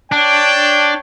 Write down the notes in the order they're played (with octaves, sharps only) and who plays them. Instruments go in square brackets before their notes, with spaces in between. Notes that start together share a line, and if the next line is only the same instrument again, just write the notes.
[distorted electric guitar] D4 [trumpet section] C#5 D5 G5